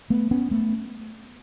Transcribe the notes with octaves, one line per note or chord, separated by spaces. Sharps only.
A3 B3
B3 C#4
A3 B3